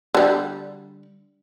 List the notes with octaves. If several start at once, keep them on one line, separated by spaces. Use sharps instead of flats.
D3 G3